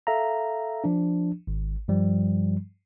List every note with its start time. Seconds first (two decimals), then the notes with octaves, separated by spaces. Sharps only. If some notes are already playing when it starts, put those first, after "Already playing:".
0.07 A4 E5 F5 A#5
0.84 F3 D4
1.47 G#1
1.88 G2 F3 G3